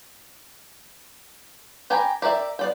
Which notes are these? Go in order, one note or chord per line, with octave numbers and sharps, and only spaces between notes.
G4 G5 G#5 A#5 B5
G4 A#4 D5 E5
B3 D5 G5